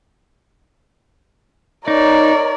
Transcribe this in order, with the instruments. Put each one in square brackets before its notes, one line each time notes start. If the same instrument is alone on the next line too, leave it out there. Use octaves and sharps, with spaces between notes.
[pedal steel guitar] D#4 [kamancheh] A#4 C#5 [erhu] D5